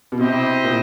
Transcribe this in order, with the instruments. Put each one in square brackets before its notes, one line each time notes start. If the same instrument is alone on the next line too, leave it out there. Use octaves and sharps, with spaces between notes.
[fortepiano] B2
[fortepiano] C3 [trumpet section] E4 G4 C5 D#5
[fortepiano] A#2